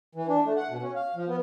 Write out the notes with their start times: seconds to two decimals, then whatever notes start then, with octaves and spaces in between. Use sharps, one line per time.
0.15 E3
0.29 D4
0.45 A3
0.56 F#5
0.70 B2
0.82 C#4
0.96 F5
1.15 F3
1.28 B3